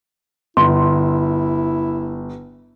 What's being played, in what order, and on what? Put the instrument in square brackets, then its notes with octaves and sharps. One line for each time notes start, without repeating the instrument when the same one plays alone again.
[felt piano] G1 [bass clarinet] E4 [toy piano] C6